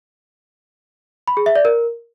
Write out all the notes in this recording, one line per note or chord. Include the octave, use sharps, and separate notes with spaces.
B5
G#4
E5
D5
A#4